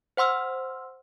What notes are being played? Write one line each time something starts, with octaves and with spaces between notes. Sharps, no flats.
C5 F#5 C6 E6 F6